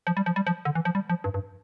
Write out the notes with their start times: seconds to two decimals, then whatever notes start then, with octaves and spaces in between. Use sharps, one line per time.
0.07 F3
0.17 G3
0.26 F3
0.36 G3
0.47 F3
0.65 D3
0.75 E3
0.85 F3
0.95 G3
1.10 F3
1.24 G2
1.34 G2